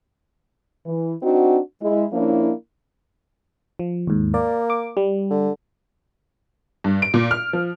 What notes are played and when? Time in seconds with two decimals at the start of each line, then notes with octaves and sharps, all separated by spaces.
0.86 E3
1.23 C4 D4 D#4 F#4
1.82 G#3 E4
2.13 F3 A#3 C#4 D4 E4
3.79 F3
4.07 D#2 G#2
4.34 A#3 D5
4.70 D6
4.97 G3
5.30 D3
6.84 G2
7.02 D7
7.14 A#2
7.31 F6
7.53 F3